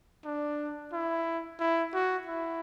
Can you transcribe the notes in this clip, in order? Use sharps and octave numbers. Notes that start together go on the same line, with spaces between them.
D4
E4
E4
F#4
E4